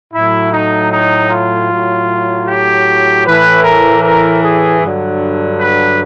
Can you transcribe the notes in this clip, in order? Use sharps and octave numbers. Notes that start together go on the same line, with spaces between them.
A2 F#3 E4
D#4
D#4
F4
A2 F#3
G4
A2 E3 B4
A#4
A#4
G#4
G2 D3 F#3
B4